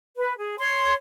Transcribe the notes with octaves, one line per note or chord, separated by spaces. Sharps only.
B4
G#4
C#5 C6